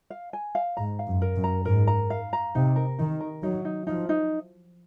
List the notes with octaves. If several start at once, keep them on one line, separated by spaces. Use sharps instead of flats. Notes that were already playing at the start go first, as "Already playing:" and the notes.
F5
G#5
F5
G#2 A#5
F5
F#2
A#4
F#2
A#5
G#2 A#4
A#5
F5
A#5
C3 D#4
A#4
D#3 D#4
A#4
F#3 D#4
D#4
F3 D#4
D#4